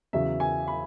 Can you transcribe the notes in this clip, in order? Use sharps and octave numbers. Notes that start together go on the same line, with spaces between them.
E2 C#3 F#3 E5
G#5
B5